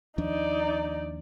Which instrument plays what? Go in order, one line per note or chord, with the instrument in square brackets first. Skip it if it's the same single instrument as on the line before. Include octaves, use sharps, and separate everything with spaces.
[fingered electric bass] D#2 F3 D4 [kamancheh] D#4 D5